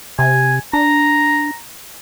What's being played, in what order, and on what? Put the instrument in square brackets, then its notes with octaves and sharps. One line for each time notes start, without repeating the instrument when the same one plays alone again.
[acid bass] C3 [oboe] G#5
[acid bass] D4 [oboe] A#5